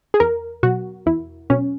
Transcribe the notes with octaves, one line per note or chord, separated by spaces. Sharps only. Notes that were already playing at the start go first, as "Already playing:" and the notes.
G#4
E2 A#4
B2 F#3 F#4
E2 E4
B2 F#3 C#4